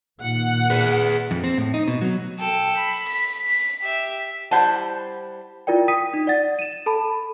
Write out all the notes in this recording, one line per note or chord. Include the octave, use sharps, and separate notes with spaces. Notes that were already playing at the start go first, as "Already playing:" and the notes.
A#2 D#3 F#5
G#4 B4
F2
C4
A2
D#4
B2
F#3
A4 G5
B5
B6
B6
G4 E5
G3 E4 C5 F#5 A5
E4 F4 A#4 D5 G5
G5 D#6 B6 D#7
D#4
D5 F#5 A6
D#7 E7
A4 A5 B5